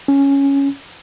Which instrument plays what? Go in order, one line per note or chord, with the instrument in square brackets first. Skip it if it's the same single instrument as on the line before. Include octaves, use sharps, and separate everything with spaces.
[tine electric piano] C#4